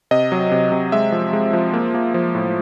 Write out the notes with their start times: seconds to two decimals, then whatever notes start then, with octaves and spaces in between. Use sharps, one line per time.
0.11 C3 D#5
0.32 F#3
0.52 C3
0.72 C3
0.92 G#3 E5
1.12 F3
1.33 G#3
1.53 F3
1.73 A#3
1.94 A#3
2.14 F3
2.35 A2